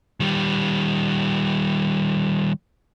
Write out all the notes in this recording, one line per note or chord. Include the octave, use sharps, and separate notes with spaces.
D#3 G3